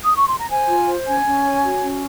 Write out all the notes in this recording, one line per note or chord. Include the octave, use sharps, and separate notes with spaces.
D#6
C#6
C6
A#5
C5 G#5
F4
C5
C#4 G#5
C#4
C#5
F#4
C#4